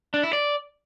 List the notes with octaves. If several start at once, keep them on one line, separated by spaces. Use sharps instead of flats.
D4
E4
D5